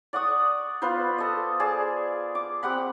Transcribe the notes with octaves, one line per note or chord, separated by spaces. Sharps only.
D5 F#5 C#6 D#6
B3 F4 B4 C5
A4 D#5
G#4 D5 A5
D6
C4 G4 F#5 B5